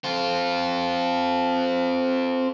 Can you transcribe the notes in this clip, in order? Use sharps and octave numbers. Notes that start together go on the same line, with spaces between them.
C4 F4